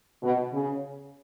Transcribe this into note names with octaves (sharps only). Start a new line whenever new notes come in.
B2
C#3